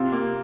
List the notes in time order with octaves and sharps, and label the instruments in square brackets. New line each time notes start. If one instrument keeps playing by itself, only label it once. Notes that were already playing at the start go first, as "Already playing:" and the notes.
Already playing: [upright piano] C3 C4 [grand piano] F4
[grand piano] A#3